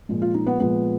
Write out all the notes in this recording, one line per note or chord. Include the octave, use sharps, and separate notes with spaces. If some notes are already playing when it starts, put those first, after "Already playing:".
A#2 F3 G#3
F4
D#4
B3
A#2 F3 G#3 B3